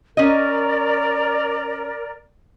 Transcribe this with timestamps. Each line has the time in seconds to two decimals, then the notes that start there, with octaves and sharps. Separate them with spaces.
0.17 C#4 A#4 D5 D#5